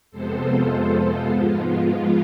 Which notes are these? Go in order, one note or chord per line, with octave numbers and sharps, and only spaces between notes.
F2 C3 G#3 B3 A4 C5
F4 A4
F4
G#2 F3 G#3 B3
F4
F4